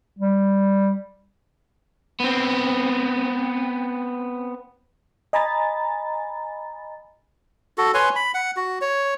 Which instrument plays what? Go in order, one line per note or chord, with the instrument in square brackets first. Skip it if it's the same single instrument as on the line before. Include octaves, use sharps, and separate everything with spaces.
[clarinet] G3
[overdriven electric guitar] B3 C4
[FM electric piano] D#5 G#5 A#5 B5 A6
[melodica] F#4 A4
B4 C#5 G#5 C6
B5
F#5
F#4
C#5